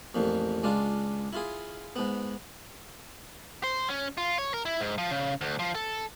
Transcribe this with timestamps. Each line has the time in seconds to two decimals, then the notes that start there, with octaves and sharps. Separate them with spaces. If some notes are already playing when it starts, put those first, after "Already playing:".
0.15 A1 F2 A#2
0.63 C#2 G#3 D4 F4
1.33 E4 F4 G#4
1.96 G#2 B3
3.64 C5
3.88 C#4
4.17 F4
4.38 C#5
4.54 A#4
4.66 E4
4.80 G#2
4.98 F3
5.11 C#3
5.41 D2
5.59 F3
5.75 A4